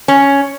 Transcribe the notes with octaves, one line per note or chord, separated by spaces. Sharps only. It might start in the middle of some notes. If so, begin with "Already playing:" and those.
C#4